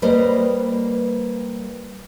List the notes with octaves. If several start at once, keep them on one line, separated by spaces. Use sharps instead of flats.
G3 A#3 B4 C5 D#5